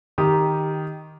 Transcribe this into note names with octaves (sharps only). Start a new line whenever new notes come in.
D#3 G4 D#6